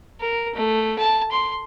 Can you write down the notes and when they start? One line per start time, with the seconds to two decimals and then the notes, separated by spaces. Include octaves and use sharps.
0.20 A#4
0.55 A3
0.98 A5
1.32 C6